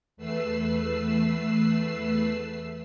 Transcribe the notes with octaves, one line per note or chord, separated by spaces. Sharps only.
E2 A3 B4 E6 C7